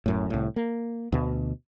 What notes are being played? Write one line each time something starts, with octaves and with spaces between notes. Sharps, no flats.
D1 F#2 A2
C2 A2
A#3
D2 B2